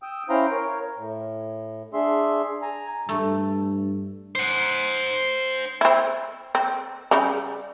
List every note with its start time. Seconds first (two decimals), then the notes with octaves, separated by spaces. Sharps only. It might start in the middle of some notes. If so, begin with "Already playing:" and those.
0.02 G5 D#6 E6
0.29 C#4 E4 C5 F5 G5 A#5
0.51 A#4 C#5
0.97 A2
1.93 D4 G#4 E5 C6
2.62 G#5 A#5
3.09 G2 A3
4.35 C5 F#5
5.81 C4 E4
6.55 C4
7.11 C#3 G3